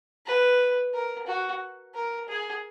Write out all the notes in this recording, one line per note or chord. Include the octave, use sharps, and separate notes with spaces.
B4
A#4
F#4
A#4
G#4